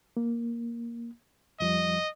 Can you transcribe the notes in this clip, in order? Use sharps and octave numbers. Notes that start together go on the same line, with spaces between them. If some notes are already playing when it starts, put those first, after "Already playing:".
A#3
F2 F3 G3 D#5